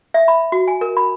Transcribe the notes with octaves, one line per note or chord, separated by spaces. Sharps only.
E5
B5
F#4
G#5
A#4
B5